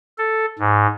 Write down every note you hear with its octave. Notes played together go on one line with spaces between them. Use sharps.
A4
G#2